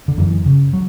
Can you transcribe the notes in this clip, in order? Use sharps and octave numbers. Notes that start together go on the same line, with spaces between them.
D3
F#2 E3
C#3
F#3